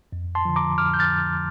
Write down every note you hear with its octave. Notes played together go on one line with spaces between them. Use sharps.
F2
A5 C6
D3 F3
A#5 D6
F2 D6 F6
G6
F6 A6